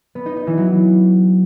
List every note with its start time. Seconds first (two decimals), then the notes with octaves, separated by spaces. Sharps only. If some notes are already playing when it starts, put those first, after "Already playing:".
0.15 B3
0.26 D#4
0.36 D#4
0.47 E3
0.58 F#3